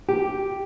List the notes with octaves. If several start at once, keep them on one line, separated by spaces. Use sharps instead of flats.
G4